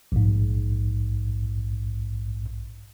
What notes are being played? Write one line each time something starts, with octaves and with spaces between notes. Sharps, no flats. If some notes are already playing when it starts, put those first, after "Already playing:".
A#1 G#2